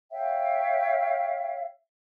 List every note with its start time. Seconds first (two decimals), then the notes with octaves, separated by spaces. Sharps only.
0.11 C#5 E5 F5 G5